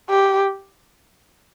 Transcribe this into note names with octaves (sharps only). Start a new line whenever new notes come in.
G4